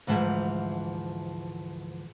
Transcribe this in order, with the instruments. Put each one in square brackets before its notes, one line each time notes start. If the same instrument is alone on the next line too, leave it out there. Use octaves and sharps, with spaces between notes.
[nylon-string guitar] D2 G#2 E3 F3 G5